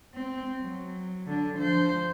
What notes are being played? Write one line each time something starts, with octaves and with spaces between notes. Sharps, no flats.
C4
F#3
D3 D4
F3 C5